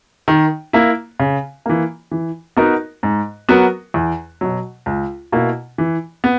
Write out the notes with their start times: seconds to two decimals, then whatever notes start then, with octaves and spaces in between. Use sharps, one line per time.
0.28 D#3
0.73 A#3 E4
1.19 C#3
1.66 E3 A#3
2.11 E3
2.57 B3 D#4 F#4 A#4
3.03 G#2
3.49 F#3 B3 F#4 A#4
3.94 E2
4.41 B2 F#3
4.86 C#2
5.32 B2 A#3 E4
5.78 E3
6.24 B3